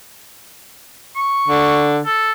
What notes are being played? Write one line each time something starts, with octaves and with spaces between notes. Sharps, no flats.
C#6
D3
A4